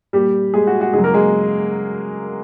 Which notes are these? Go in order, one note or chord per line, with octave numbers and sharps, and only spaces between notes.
A#2 G3 G4
G#3 G#4
F#4
F#4
C#3 F#3 G#3 G#4
A#3 A#4
G#3 G#4